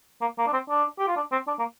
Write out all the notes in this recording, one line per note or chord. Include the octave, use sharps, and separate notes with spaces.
A#3
A#3
D4
C4
D4
G4
F4
D4
C4
D4
A#3